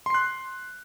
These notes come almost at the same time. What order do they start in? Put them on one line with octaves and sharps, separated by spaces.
C6 C7 F#6